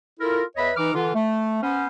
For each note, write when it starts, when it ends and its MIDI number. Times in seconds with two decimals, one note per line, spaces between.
0.20 0.43 64
0.20 0.43 65
0.20 0.43 69
0.20 0.43 70
0.57 0.72 40
0.57 0.72 71
0.57 0.72 73
0.57 0.72 75
0.57 0.72 76
0.57 0.72 83
0.76 0.92 52
0.76 0.92 63
0.76 0.92 71
0.76 0.92 86
0.76 0.92 89
0.94 1.11 50
0.94 1.11 52
0.94 1.11 65
1.14 1.61 57
1.61 1.87 59
1.61 1.87 61
1.61 1.87 72